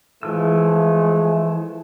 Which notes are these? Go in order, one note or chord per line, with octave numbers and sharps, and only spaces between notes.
E3 F3 G#3 A3 E6